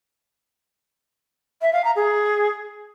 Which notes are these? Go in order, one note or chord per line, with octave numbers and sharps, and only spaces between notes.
E5
F5
A#5
G#4